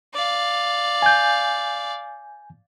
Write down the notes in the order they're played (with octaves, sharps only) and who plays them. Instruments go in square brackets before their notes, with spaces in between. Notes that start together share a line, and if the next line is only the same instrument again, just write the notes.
[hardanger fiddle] D5 F5
[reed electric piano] G#5 G6